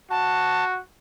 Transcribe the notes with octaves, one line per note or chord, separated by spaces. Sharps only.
F#4 A5